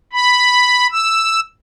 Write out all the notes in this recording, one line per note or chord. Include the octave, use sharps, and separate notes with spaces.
B5
E6